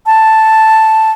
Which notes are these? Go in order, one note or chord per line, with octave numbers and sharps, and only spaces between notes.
A5